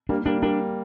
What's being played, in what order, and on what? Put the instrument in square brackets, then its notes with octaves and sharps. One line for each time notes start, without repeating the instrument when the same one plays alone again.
[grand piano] G3 A#3 [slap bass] D4
[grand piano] G3 A#3 [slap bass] D4
[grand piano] G3 A#3 [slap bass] D4